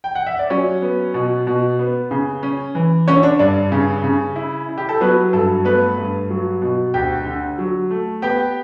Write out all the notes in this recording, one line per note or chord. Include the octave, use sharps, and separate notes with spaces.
G5
F#5
E5
D5
F#3 C#4 C#5
B3
B2
B2
B3
C#3
C#4
E3
D3 C#4 C#5
D4 D5
G2 D4 D5
C#3
C#3
E4
E4
G4
A4
F#3 B3 B4
G2 A4
A3 B3 B4
G2
F#3
B2
D2 G4 G5
D3
F#3
A3
B3 G4 G5